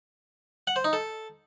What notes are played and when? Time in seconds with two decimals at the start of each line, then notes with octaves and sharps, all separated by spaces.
0.67 F#5
0.76 C5
0.84 D#4
0.93 A4